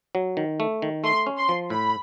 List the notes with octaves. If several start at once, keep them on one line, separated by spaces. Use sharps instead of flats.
F#3
D#3
A3
D#3
A3 C6
C#4
C6
F3
A2 B5